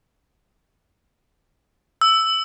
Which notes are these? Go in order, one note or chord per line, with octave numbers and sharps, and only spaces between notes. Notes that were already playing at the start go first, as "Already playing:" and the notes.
E6